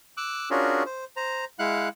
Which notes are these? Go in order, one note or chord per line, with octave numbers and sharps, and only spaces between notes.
D6 E6 F#6
C#4 D4 F4 F#4 G#4 A#4
C5
C5 A#5
G#3 E4 F5 F#5 F#6